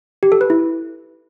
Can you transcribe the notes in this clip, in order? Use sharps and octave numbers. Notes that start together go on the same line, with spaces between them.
G4
A4
B4
E4